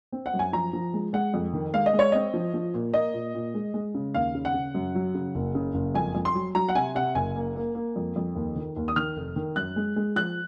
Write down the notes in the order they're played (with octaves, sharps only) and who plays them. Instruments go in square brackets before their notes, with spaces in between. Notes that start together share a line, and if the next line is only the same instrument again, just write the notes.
[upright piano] C4
F#5
F#2
G#5
F3 A#5
F3
G#3
G#3 F#5
F2
D#3
G#3 F5
D#5
G#3
C#5
C4 D#5
F3
F3
A#2
A#3 D#5
A#2
A#2
G#3
G#3
C#3
D#2 F5
C#3
F#5
C#3
F#2
F#3
C#3
F#1
C#3
F#1
F2 G#5
F2
C6
F#3
F#3 A#5
F#5
C3 G#5
C3 F#5
F#1 G#5
A#3
A#3
A#3
F2
F2
D#2
D#3
D#2
D#6
D#3 F6
F1
D#3
F#2 F#6
G#3
G#3
F3 F#6